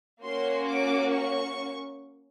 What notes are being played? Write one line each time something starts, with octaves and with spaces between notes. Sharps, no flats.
A#3 C#4 F#4 C6
D6
C#6